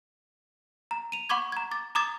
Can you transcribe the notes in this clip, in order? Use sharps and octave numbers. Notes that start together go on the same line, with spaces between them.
A#5
D#7 F7
F#5 B5 C#6 D6 G#6
A#5 G#6
D6 A6
A#5 D6 D#6 G#6 A6